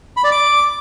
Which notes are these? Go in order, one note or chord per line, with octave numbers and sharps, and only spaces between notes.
B5
D5
D6